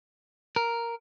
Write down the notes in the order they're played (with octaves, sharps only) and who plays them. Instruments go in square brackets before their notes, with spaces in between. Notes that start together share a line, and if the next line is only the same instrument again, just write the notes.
[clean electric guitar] A#4